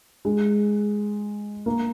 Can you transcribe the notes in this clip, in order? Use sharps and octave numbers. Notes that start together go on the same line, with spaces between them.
G#3
A#3